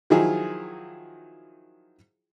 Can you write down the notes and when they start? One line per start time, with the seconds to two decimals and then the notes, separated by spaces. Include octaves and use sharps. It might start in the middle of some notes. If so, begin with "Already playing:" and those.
0.10 D#3 F3 F#3 E4 F4 G#4